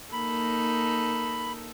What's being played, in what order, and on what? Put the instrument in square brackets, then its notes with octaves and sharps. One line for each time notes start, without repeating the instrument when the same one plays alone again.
[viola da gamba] A#3 D#4 A4 [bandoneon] B5